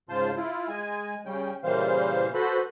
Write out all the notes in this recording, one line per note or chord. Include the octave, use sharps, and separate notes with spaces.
G#2 C#3 F4 C5 A5 C6
E4 F4
G#3 G#5
C#3 G3 C#4 G5
A#2 C#3 E3 G3 C5 F5
F#4 A4 B4 C5 B5